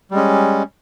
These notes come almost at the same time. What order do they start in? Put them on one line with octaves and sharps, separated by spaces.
G3 G#3 C#4